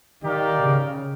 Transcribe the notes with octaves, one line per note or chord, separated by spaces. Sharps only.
D#3 D#4 G4 A#4 D5 F5
C#3